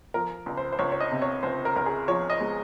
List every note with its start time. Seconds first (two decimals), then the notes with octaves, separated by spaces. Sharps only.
0.14 F3 A#4
0.46 C#2
0.57 C5
0.72 C5
0.79 C#2 C#5
0.92 C#5
1.00 D#5
1.11 C3
1.22 C#5
1.43 C#2 C5
1.65 A#4
1.76 C#2 A#4
1.86 G#4
2.08 F3 C#5
2.30 D#5
2.40 G#3